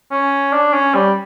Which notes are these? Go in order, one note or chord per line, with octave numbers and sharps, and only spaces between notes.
C#4
D4
C#4
G3